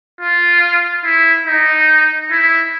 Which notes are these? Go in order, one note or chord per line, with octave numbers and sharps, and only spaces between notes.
F4
E4
D#4
E4